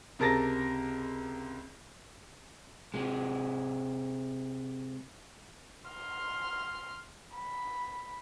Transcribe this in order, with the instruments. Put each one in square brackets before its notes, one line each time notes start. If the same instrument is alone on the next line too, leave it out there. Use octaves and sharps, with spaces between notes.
[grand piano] C#2 C3 A#4 A5 A6 A#6
[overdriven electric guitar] C3 G#3
[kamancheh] C6 F6
B5